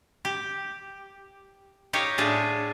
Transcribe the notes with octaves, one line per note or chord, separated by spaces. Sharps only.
G4
D#4 G4 C#5 F5
A2 D4 F4 G#4 E5